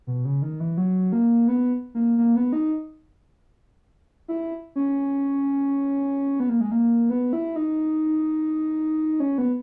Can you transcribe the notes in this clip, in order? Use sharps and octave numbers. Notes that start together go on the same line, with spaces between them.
B2
C#3
D#3
E3
F#3
A#3
B3
A#3
A#3
B3
D#4
E4
C#4
B3
A#3
G#3
A#3
B3
E4
D#4
C#4
B3